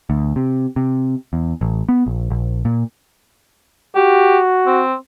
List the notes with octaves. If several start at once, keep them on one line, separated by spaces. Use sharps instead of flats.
D2
C3
C3
E2
A1
B3
A#1
A#1
A#2
F#4 G4
C4